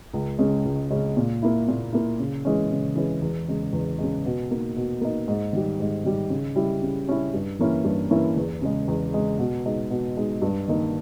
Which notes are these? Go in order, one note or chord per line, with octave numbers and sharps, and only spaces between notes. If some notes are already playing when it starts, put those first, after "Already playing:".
C#2
C#3 G#3 C#4
C#2
C#3 G#3 C#4
A#2
A#3 E4
A#2
A#3 E4
C#3
E3 G#3 C#4
C#3
E3 G#3 C#4
E2
C#3 G#3
E2
C#3 G#3
B2
A#3 D#4
B2
A#3 D#4
G#2
D#3 G3
G#2
D#3 G3
C#3
G3 C#4 E4
C#3
G3 C#4 E4
G2
E3 A#3 C#4 E4
G2
E3 A#3 C#4 E4
E2
C#3 G#3
E2
C#3 G#3
B2
G#3 D#4
B2
G#3 D#4
G2
D#3 A#3 D#4